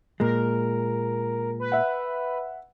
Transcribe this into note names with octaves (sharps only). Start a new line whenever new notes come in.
A#2 G#3 A#4
B4
E5 F#5